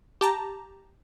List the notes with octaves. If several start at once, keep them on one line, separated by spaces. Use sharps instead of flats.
G4 A5 A#5